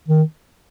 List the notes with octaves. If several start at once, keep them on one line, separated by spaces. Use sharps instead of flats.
D#3